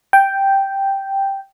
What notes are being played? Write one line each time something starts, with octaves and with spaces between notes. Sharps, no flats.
G5